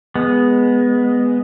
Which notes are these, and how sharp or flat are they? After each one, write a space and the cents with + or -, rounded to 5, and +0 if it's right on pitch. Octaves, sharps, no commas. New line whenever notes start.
G#3 -5 B3 +0